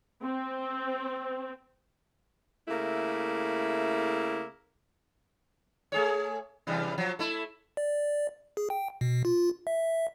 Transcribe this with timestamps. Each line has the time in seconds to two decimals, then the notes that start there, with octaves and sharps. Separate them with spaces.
0.22 C4
2.68 C#3 A3 A#3 E4
5.92 A3 G#4 C#5
6.67 C3 E3 G3
6.98 F3 F#3
7.19 A3 E4
7.77 D5
8.57 G#4
8.70 G5
9.01 B2
9.25 F4
9.67 E5